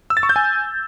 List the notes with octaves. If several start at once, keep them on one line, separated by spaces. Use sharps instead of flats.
E6
A6
C#6
G6
G#5